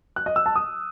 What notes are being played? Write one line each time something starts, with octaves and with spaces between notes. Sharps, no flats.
F#6
D#5
E6
A5
D#6